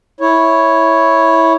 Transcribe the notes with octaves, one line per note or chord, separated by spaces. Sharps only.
E4 C#5